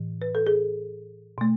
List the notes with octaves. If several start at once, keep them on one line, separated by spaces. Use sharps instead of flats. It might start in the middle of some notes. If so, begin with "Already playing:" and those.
Already playing: A2 E3
B4
A4
G#4
B2 A3